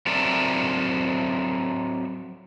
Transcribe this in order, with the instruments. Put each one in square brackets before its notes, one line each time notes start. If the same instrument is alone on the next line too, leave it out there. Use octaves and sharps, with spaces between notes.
[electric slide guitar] F#3 C4 A4 A#4 D5 E5